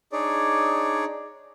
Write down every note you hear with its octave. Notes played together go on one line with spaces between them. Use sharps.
D4 D#4 G#4 C#5 D5